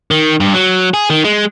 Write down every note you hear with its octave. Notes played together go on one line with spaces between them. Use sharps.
D#3
G2
F#3
G#4
D#3
G#3